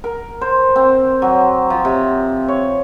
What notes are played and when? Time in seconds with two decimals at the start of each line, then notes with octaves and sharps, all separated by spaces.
0.04 A#4
0.41 C5
0.76 C4
1.22 F#3
1.70 F3
1.85 C3
2.48 C#5